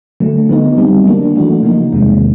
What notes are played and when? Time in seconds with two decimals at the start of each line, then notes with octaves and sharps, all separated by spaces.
0.20 D3 F#3 A3
0.49 D3 F#3 B3 D#4
0.77 D3 G3 C4
1.06 D#3 F#3 A#3 D4
1.35 E3 A3 D4 F#4
1.63 C#3 F3 A#3 D#4
1.93 E2 C3 D#3 G#3